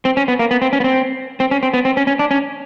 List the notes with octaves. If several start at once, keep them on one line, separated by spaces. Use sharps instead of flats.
C4
C#4
B3
A#3
B3
C4
C#4
B3
C4
C4
C#4
C4
B3
C4
C#4
C#4
D4
C#4